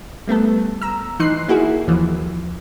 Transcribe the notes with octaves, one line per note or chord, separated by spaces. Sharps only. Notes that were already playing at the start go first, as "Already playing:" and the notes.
G3 A3 B3 A4
A#5 E6
E3 D#4 C6 F#6 C7
A#3 E4 F#4 G#4
D#2 E3 F3